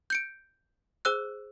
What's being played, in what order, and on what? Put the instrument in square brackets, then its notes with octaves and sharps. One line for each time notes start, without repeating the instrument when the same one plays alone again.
[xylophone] G6 C#7 D7
G#4 C5 E6 F#6